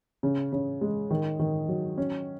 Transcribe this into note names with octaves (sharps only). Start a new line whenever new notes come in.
C#3
C#3
G#3
D#3
D#3
F#3
C#4